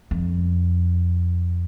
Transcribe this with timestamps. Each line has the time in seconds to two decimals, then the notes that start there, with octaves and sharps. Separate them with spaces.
0.11 F2